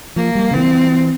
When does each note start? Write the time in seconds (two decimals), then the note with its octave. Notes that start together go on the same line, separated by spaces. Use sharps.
0.16 F3 A#3
0.35 G3
0.51 C#3
0.54 E3 C4